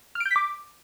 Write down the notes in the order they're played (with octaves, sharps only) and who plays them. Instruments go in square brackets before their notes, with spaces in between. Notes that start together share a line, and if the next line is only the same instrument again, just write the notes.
[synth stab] F6
D7
G6
B6
D6